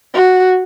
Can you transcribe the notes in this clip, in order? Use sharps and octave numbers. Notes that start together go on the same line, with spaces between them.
F#4